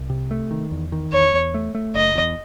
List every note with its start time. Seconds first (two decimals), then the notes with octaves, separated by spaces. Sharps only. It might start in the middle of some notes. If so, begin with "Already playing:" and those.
Already playing: C2
0.10 C3
0.31 A3
0.51 D#3
0.71 E2
0.92 D#3
1.12 E2 C#5
1.33 E2
1.54 A3
1.75 A3
1.95 F#1 D#5
2.15 E2